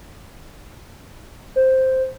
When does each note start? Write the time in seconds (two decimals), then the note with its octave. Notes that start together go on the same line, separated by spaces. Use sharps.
1.56 C5